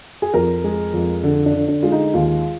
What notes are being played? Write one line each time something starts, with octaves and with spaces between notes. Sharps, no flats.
G#4
F2 A#4
G#3
F2
D3
D4
D3
D4
G#3 F4
D#4
D#2 F4